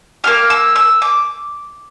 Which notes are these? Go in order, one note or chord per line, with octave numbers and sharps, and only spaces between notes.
A#3 E4 G4 F6
E6
E6
D6